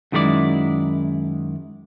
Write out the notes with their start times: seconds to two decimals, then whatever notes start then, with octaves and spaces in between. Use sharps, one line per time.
0.12 F#2 D#3 G#3 E4 G#4 D5